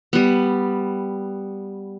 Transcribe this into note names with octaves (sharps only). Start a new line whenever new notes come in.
G3 B3